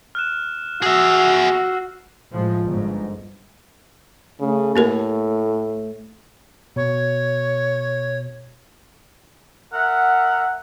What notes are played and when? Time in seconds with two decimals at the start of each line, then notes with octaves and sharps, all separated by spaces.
0.15 F6 F#6 E7
0.82 F#4 G#4 E5 E6 C7
2.31 A2 F3 G#3
2.64 G1 G#2
4.40 C#3 A3
4.76 A2 A#3 G4 A#4
6.76 B2 C#5
9.73 A#4 E5 F#5